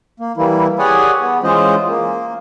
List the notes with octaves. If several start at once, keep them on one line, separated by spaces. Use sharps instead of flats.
A#3
E3 G3 A#3 E4
G4 G#4 C#5 D5 F#5 G#5
B3
E3 G#3 C#4 F4 C5 D#5
A#3